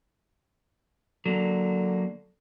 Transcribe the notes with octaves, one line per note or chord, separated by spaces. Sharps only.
D3 F#3 A#3